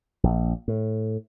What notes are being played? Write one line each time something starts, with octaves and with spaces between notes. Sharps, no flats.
A#1
A2